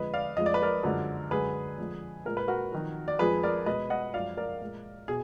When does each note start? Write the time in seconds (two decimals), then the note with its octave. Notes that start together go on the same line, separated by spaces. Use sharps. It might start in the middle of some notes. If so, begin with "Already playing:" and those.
Already playing: F2 D3 G#3 B4 D#5
0.14 D5 F5
0.37 F2 F3 G#3 D#5
0.46 D5
0.54 B4
0.62 A#4 D5
0.83 F#2 D3 F3 G#3
1.31 F#2 D3 G#3 G#4 B4
1.78 F2 D3 F3 G#3
2.25 A#2 G#3 A#4
2.37 B4
2.48 F#4 A#4
2.72 F2 D#3 F#3
3.08 D5
3.19 F2 F3 G#3 G#4 B4
3.43 A#4 D5
3.66 B2 G#3 B4 D#5
3.90 D#5 F#5
4.14 F#2 F3 G#3 D5 F5
4.37 A#4 D5
4.61 A#2 G#3
5.08 B2 G#4